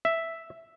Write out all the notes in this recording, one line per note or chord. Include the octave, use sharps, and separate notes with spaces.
E5